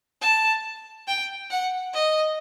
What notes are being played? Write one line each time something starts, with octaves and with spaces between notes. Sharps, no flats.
A5
G5
F#5
D#5